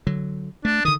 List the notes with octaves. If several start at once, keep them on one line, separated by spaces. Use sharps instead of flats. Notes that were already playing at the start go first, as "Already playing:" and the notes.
D3 F#3
A3 D4
D3 D#3 D#6